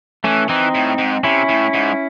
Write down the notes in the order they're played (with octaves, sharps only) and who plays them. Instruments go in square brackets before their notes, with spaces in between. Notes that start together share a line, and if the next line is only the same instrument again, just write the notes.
[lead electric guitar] E3 [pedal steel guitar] A3 C#4
[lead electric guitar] E3 [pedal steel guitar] C4 D#4
[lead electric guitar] A2
G#2
[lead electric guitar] C3 [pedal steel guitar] C#4 E4
[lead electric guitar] A2
G#2